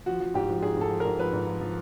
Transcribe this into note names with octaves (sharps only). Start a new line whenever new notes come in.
F3 F#4
F3
G#2 G4
F3
G#2 G#4
G#2 A4
F3
G#2 A#4
F3 B4
G#2
F3
F3